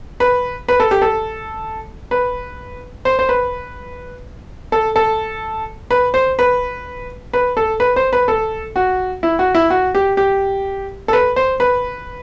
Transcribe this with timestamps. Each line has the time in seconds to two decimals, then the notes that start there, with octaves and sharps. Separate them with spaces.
0.20 B4
0.68 B4
0.80 A4
0.91 G4
1.02 A4
2.11 B4
3.05 C5
3.19 C5
3.29 B4
4.72 A4
4.96 A4
5.91 B4
6.14 C5
6.39 B4
7.33 B4
7.57 A4
7.80 B4
7.96 C5
8.13 B4
8.28 A4
8.76 F#4
9.23 E4
9.39 F#4
9.55 E4
9.70 F#4
9.95 G4
10.17 G4
11.08 A4
11.13 B4
11.36 C5
11.60 B4